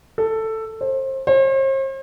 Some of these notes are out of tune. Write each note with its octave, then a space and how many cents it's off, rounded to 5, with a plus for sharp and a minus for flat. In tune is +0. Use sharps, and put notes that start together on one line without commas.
A4 +10
C5 +30
C5 +45